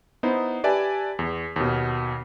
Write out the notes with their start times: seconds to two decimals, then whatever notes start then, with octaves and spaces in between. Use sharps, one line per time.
0.23 B3 D#4 E4 C5
0.64 G4 B4 D5 E5 G#5 A5
1.19 E2
1.56 D#2 B2